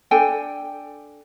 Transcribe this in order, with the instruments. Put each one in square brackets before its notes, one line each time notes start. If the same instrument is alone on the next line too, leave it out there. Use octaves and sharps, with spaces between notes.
[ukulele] D4 A4 G5 G#5